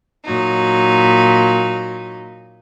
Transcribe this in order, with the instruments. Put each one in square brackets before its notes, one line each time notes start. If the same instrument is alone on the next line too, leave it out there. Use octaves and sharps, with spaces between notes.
[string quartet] A#2 F#3 D#4